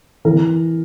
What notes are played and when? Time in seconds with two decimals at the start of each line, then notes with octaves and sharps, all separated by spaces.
0.25 E3 A#4